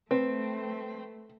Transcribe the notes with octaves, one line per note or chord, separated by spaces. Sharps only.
A3 C4 B4